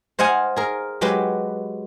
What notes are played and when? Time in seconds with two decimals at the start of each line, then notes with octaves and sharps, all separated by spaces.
0.19 C5 D#5 F5 F#5 G#5
0.56 G#4 A#4
1.01 F#3 G#3 G4 B4